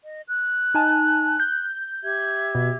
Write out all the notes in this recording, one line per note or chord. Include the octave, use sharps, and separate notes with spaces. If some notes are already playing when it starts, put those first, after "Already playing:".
D#5
F#6
D#4 G#5 A5
G6
G4 E5 G#6
B2